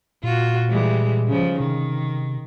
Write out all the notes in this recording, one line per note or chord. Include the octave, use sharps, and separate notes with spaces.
A#2 F4 F#4
E3 G3 G#3
C#3 F3
C3 D#3